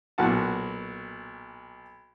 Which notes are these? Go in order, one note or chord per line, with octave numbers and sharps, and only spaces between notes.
B1 A#2 F#4 F#5 A5